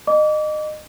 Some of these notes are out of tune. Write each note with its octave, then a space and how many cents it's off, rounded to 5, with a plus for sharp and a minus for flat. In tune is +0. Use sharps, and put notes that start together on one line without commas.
D#5 -25 D6 -30